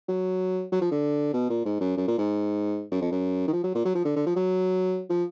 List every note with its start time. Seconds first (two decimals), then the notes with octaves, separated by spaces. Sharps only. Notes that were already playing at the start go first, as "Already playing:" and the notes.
0.08 F#3
0.72 F#3
0.81 F3
0.92 D3
1.33 B2
1.50 A#2
1.65 G#2
1.80 F#2
1.97 F#2
2.07 A#2
2.18 G#2
2.91 F#2
3.01 F2
3.11 F#2
3.48 D#3
3.53 F3
3.64 F#3
3.75 A#2
3.85 F#3
3.95 F3
4.05 D3
4.16 D3
4.26 F3
4.36 F#3
5.10 F3